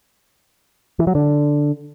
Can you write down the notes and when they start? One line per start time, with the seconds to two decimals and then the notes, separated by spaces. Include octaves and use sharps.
0.99 E3
1.07 F#3
1.15 D3